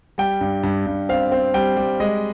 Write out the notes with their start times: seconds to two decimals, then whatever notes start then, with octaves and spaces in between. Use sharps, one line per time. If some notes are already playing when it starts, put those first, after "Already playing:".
0.18 G3 G5
0.41 G2
0.63 G2
0.86 G2
1.09 C4 F5
1.32 C4
1.54 G3 G5
1.77 G3
2.00 G#3 D#5